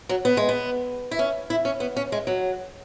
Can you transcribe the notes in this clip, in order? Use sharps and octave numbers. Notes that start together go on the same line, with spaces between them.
F#3
B3
G#3
B3
E4
C#4
E4
C#4
B3
C#4
G#3
F#3